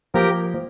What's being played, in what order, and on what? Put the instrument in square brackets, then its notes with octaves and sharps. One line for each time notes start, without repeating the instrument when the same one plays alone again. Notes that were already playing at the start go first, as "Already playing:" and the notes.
[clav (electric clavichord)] F3 A#3 [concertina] G4 A#4 G5